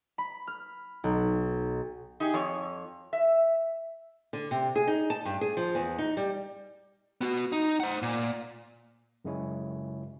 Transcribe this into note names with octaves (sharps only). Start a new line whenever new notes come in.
B5
F6
B1
D#4 G4 G#4
F2 C#5
E5
D3
C3
G#4
D#4
A5
G2
G#4
F3
E2
D#4
G3
B3 F#4
D#4
C5 F#5
A#2
F#2 C#3 G#3 C#4 E4 C#5